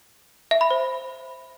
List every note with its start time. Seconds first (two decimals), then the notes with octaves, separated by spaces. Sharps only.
0.51 E5
0.61 B5
0.71 C5